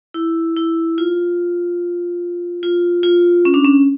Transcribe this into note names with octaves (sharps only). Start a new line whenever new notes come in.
E4
E4
F4
F4
F4
C#4
D4
C#4